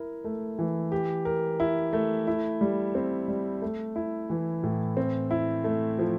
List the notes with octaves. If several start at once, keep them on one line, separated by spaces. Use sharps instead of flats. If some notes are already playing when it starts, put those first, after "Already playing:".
Already playing: E4 A#4
A3
E3
G4
A#4
E4
A3
E4
G3
C4
G3
A3
E4
E3
A2
C4
E4
A3
F3